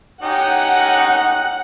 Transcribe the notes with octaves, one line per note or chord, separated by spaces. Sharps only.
C#4 D#4 G4 F#5